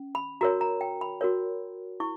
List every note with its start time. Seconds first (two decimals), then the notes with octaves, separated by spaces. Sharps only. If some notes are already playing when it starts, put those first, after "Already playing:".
Already playing: C#4
0.15 B5
0.41 F#4 A#4 C#5 A#5
0.61 A#5
0.81 G5
1.01 B5
1.21 F#4 A#4 C#5
2.00 E4 C#6